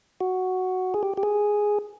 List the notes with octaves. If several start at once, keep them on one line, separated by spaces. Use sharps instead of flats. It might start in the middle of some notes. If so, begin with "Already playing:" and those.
F#4
G#4
G4
G4
G#4